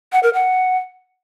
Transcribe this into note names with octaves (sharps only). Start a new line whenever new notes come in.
F#5
A#4
F#5